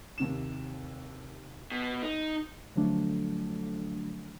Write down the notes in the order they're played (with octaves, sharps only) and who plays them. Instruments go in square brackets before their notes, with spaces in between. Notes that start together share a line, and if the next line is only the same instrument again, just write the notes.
[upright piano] D#2 C3 E7
[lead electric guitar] B2
D#4
[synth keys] D3 F3 F#3 A3 D4